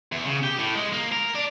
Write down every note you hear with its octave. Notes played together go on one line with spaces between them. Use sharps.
E2
C#3
G4
A2
G#3
A#3
A#4
D4